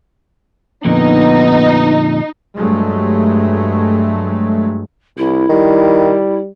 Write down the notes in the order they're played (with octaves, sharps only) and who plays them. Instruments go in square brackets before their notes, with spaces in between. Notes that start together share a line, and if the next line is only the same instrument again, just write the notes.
[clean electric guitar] F2 A#2 D3 [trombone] B3 [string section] D#4
[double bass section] G2 F#3 G#3 A3
[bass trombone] C2 [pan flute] E4
[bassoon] D#3 [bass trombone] G3